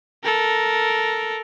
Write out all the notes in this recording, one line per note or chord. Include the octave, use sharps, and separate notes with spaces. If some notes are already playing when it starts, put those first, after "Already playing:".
A4 A#4